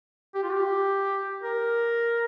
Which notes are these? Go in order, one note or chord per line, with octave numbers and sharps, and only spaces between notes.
G4
F4
G4
A#4